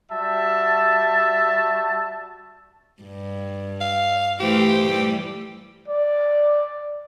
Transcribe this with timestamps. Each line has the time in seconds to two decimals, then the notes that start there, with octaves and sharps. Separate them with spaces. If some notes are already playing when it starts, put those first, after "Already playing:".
0.11 G3 F#4 E5 A5
3.03 G2
3.81 F5
4.40 E3 A3 G4 C5
4.87 E3 G3 A3
5.88 D5